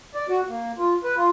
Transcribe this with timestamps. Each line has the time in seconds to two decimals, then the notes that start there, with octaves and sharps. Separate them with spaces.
0.14 D5
0.29 F#4
0.49 A#3
0.78 F4
1.04 B4
1.17 F4